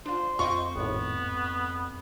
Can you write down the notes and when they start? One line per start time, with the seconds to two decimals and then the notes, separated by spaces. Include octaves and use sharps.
0.06 D4 F4 C5
0.39 F2 F4 D#5 G5 C#6
0.75 G#1 A2 B3